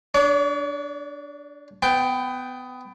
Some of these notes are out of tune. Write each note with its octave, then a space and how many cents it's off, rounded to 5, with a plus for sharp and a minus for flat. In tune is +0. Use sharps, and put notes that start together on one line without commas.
D4 +0 C#5 +45
B3 +25 G5 +0